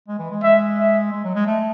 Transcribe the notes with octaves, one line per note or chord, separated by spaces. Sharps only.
G#3
E3
G#3
G#3 E5
E5
G#3
F#3
G#3
A3